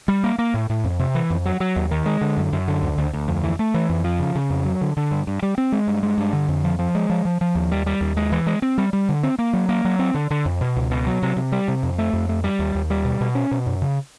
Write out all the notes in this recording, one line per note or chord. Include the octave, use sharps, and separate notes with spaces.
G3
A#3
A#3
A2
A2
F2
C3
E3
F2
F#3
F#3
D#2
D#3
G#3
D3
F#2
F#2
D3
D2
D2
D2
F2
E3
A3
E3
F2
F3
C#3
C#3
F2
F#3
D3
D3
G2
G2
G3
C4
G#3
G2
G#3
G2
D3
F2
F3
F3
G#3
F3
F3
F3
D#2
G3
G3
D#2
G#3
E3
G#3
C4
G3
G3
D3
C4
A#3
F#3
A#3
F#3
C4
D3
D3
F2
B2
C#2
B2
F#3
C3
C3
G3
C3
F2
A3
F2
A3
G3
D#2
D#2
G3
B2
B2
C#4
B2
F#2
C#3